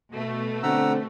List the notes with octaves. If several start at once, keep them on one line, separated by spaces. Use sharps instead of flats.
B2 A3
D3 C4 F#5 A#5 E6